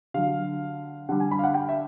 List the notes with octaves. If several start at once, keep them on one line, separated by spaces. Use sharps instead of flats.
D3 F#3 F5
D3 G3 F#5
G#5
B5
F5
F#5
G5
E5